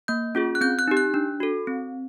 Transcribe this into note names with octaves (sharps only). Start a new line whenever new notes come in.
A#3 G6
C#4 F4 G#4
F#6
C4 G6
F#6
D#4 G4
F#6
D4
F#4 A4
C4